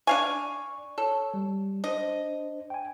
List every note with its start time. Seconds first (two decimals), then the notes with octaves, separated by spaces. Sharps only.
0.07 D4 D5 F5 G#5 C#6
0.98 A4 C#5
1.34 G3
1.84 D4 C5 D#5
2.70 G5 G#5